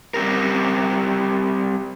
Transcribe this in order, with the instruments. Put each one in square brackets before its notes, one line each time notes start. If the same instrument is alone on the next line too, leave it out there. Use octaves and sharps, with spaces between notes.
[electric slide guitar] G3 C4 G4 A#4